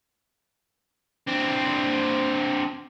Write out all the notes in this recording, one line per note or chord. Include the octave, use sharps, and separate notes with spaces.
C4 D4